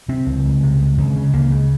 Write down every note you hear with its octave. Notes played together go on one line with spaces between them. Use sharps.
C3 C4
C#2
C#2
C3
C#2
C#2
C#3
C#2 A#3
C#3